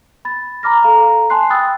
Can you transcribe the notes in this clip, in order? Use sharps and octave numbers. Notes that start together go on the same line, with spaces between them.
B5 A6
A#5 B5 D6 F6 A#6
A4 F5 A#5
G#5 A5 C6 F#6 C7
G5 B5 D#6 E6 F#6 A6